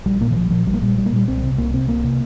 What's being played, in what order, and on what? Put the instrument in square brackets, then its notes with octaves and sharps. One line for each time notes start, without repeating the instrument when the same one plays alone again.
[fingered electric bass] A#1 G3
A#2 A#3
D#3
A#1 F3
A#2 F3
A#1 G3
A#3
A#2 G3
A#1 G3
A#3
A#2 G3
C2 C4
C3
C2 A#3
C3 C4
C2 A#3
C3